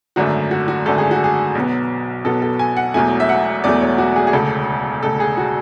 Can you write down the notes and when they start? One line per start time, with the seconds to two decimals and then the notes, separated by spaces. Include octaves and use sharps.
0.16 G#1 F#2 D3 A3 F#4
0.51 F#4
0.68 F#4
0.85 G#1 F#2 D3 A3 A4
0.98 G#4
1.11 F#4
1.24 G#4
1.55 B1 B2 F#3 B3
2.25 B1 B2 F#3 B3 A4
2.42 A4
2.59 G#5
2.77 F#5
2.94 E1 E2 B2 F#3 A3 G#5
3.20 E5
3.29 F#5
3.64 E1 E2 B2 F#3 A3 D5
3.81 C#5
3.98 F#4
4.16 G#4
4.27 G#4
4.33 E1 D2 C#3 A4
5.03 E1 D2 C#3 A4
5.20 G#4
5.37 F#4